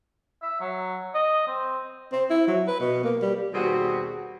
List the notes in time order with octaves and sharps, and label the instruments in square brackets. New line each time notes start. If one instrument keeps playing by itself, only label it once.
[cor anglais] E5
F#3
D#5
C4
[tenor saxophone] C4
E4
F#3
B4
B2
A#3
G3
[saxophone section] D#2 B2 G3 C4 F#4 G#4